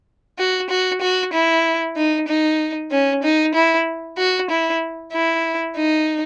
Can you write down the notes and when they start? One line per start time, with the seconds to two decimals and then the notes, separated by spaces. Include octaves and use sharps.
0.38 F#4
0.70 F#4
1.01 F#4
1.33 E4
1.97 D#4
2.28 D#4
2.91 C#4
3.23 D#4
3.55 E4
4.18 F#4
4.50 E4
5.13 E4
5.77 D#4